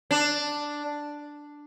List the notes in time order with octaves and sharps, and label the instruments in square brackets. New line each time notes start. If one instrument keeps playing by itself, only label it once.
[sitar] D4